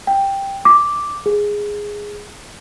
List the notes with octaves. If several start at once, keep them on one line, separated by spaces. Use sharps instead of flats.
G5
D6
G#4